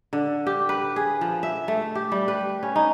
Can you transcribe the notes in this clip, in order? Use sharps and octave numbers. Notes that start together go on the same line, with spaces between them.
D3
G4
B4
G#4
F3
E5
A3
G4
G3
B4
C#4
D#4